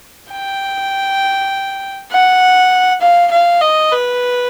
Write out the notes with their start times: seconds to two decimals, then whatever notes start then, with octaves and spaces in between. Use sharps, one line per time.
0.32 G5
2.12 F#5
3.01 F5
3.32 F5
3.61 D#5
3.91 B4